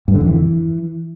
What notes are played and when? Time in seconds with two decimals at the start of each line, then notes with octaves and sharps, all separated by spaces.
0.08 G2
0.14 D3
0.21 F2
0.27 E3